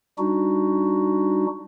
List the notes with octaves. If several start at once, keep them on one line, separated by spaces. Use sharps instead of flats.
G3 D4 D#4 F#4